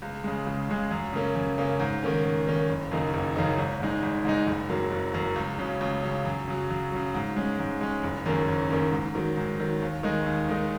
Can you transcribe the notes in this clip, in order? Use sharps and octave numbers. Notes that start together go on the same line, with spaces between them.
C#2
C#3 G#3
C#2
C#3 G#3
F#2
C#3 A#3 C#4
F#2
C#3 A#3 C#4
G#2
D#3 A#3 C#4
G#2
D#3 A#3 C#4
F#1
F#2 C#3 A#3 D#4
F#1
F#2 C#3 A#3 D#4
G#1
G#2 G#3 D#4
G#1
G#2 G#3 D#4
F#1
F#2 F#3 A#3
F#1
F#2 F#3 A#3
C#2
C#3 F#3 C#4
C#2
C#3 F#3 C#4
F#2
C#3 F#3
F#2
C#3 F#3
G#2
G#3 C#4
G#2
G#3 C#4
F#1
F#2 D#3 A#3 C#4
F#1
F#2 D#3 A#3 C#4
G#2
D#3 F#3
G#2
D#3 F#3
D#2
D#3 G#3 D#4
D#2
D#3 G#3 D#4